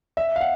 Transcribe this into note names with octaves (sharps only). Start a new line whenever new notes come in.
E5
F5
F#5